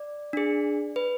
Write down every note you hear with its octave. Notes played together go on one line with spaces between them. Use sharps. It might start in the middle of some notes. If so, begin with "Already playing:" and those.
Already playing: D5
D4 G#4
B4